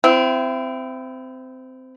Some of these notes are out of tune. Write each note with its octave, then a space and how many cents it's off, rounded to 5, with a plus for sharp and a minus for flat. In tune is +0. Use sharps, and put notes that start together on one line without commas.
C4 -20 E4 +30